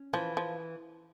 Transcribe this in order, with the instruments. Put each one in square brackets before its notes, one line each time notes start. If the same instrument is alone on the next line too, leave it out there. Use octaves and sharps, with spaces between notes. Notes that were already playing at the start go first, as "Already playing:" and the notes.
Already playing: [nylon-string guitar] C#4
[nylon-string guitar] E3 [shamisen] F3
[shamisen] F3